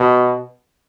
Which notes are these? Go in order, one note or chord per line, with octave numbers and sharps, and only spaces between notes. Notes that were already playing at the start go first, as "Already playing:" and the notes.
Already playing: B2